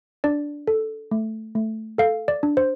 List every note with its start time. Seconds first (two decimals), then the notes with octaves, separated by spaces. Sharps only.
0.24 D4 D5
0.68 A4
1.11 A3
1.55 A3
1.98 A4 F5
2.28 D5
2.43 D4
2.57 C5